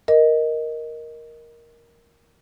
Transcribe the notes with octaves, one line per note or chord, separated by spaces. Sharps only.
A#4 D#5